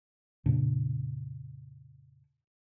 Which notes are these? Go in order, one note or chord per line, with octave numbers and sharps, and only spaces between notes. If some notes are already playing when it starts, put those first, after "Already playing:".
F2 A#2 C#3 D4